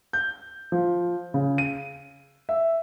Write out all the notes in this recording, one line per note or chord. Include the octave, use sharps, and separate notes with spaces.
G6
F3
C#3
D#7
E5